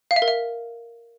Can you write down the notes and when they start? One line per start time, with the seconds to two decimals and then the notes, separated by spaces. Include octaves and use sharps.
0.11 F5
0.16 E5
0.22 A#4
0.28 E5